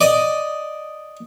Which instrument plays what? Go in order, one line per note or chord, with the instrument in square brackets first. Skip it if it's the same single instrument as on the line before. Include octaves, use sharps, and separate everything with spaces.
[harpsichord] D5 D#5